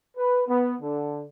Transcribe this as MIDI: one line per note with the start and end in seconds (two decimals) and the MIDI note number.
0.17 0.42 71
0.48 0.75 59
0.80 1.24 50